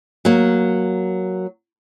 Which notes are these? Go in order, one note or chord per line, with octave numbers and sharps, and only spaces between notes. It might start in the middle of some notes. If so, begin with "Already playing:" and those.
F#3 A#3